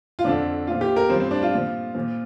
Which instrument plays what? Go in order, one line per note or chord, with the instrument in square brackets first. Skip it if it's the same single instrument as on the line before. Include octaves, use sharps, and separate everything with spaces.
[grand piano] F4
F2 D3 F3 D4
A#2 F3 F4
G4
A#4
G2 F3 C4
C4
D4
F4
A#2 F3
A#2 F3